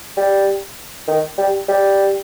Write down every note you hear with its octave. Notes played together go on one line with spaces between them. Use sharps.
G3
D#3
G3
G3